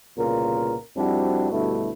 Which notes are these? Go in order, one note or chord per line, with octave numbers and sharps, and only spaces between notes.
C2 A#2 C#3 B3 F4 A#4
F2 G3 C4 D4 E4 F#4
D2 G2 B2 A3 E4